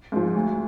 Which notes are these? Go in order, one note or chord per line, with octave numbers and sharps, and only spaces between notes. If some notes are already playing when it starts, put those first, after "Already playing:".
G#2 F3
D2